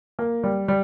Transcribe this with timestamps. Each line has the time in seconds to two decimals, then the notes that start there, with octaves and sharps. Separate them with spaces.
0.19 A#3
0.44 G3
0.68 G3